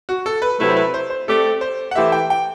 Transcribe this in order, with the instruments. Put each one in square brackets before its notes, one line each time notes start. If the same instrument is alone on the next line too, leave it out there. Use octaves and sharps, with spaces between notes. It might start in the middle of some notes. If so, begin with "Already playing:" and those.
[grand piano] F#4
A4
B4
[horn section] C3 F#3 A3 E4 [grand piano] B4
[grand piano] C5
B4
C5
C5
[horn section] A3 C4 G4 D5 [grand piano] A4
[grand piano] C5
F#5
[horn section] E3 A3 E4 G4 C5 [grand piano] E5
[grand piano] G5
G5